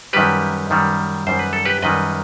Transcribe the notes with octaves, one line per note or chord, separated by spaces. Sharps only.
F#2 D#3 G3 G4 B4
F#2 D#3 G3
F#2 D#3 G3 C5
B4
A4
G4 B4
F#2 D#3 G3 B4 D#5